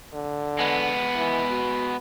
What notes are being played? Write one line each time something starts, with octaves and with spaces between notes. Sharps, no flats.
D3
G#3 B3
E3
F#4